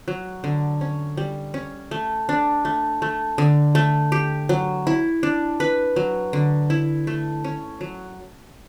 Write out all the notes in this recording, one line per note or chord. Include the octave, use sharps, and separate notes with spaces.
F#3
D3
C#4
G3
C#4
A3
D4
A3
A3
D3
A3
G4
F#3
E4
D4
B4
F#3
D3
E4
A3
C#4
F#3